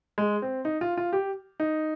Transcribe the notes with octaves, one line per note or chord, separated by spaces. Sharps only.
G#3
C4
D#4
F4
F4
G4
D#4